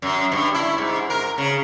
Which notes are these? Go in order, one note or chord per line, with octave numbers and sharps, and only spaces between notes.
F#2
G2
E4
G#2
A#4
C#3